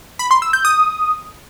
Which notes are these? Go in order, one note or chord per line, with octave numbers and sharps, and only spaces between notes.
B5
C6
E6
G6
D#6